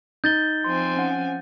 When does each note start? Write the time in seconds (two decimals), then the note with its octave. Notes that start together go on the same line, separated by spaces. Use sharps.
0.24 D#4 G6 A6 G7
0.64 F3 C4 G#5 C6
0.97 C#4 F#5